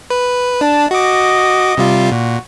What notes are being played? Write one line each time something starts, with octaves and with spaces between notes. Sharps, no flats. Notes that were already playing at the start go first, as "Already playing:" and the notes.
B4
D4 A5
F#4 D#5 D6
C3 G3 F4
A#2 F#4